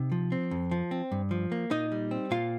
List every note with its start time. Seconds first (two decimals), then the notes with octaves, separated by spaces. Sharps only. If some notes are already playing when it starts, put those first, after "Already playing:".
Already playing: C3 D#4
0.12 F3
0.32 C4
0.51 F2
0.71 F3
0.91 C4
1.12 G2
1.31 F3
1.52 A#3
1.71 A#2 D#4 D#5
1.92 G3
2.11 C4
2.31 A#2 F4 F5